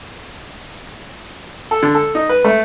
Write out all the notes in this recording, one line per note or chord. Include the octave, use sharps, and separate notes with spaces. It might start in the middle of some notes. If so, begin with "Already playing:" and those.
A4
D3
A4
D#4
B4
A3